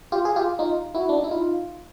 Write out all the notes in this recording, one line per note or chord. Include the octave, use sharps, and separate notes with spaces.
F4 G4
G#4
F4 G4
D#4 F4
E4 F#4
D4
D#4
E4
D#4 F4